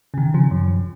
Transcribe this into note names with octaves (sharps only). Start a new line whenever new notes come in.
C#3
C3 D#3
C#3 F3
F#2